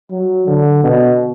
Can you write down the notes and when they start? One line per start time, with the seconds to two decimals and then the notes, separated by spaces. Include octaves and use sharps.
0.11 F#3
0.47 D3
0.83 B2